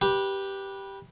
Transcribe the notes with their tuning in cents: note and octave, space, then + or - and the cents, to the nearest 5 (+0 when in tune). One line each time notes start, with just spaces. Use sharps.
G4 +0 B4 -20